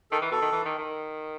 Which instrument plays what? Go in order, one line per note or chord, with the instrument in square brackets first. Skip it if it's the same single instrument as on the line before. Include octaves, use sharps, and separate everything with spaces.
[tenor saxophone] D#3 [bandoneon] A4
[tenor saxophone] E3
[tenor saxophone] B2 [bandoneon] A4
[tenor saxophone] D#3
E3
D#3
D#3